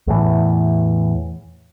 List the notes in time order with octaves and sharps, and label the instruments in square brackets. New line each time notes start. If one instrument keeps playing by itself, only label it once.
[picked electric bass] E2 A2 E3